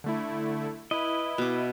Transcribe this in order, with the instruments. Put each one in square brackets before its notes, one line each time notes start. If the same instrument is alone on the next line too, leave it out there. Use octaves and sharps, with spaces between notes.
[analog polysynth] D3 A3 E4
[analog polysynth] E4 [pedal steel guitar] B4 D#5
[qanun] B2 D6